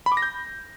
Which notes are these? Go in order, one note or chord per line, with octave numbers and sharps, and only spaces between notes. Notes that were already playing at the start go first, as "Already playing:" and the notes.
B5
D6
A#6
G6